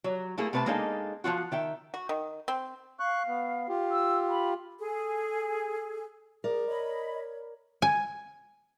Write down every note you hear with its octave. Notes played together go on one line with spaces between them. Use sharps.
F#3
A3 A#3 E4 G#4
C3 A3 B4 C5 A5
G#3 A#3 D4 D#4 A4 F5
F3 A#3 F4 F#4
D#3 E5 G5
F#4
D#3
C4
F5 C#6 F#6
B3
F4 G4
E6
B5
G#4 A4
G#4 A#4 D5
C#5 D#5 B5
G#5